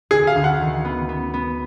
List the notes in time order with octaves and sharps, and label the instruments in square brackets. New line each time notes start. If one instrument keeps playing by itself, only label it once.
[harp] D2 [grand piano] G#4
[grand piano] F5
[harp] D2
[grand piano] F#5
[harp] D#3
B3
B3
B3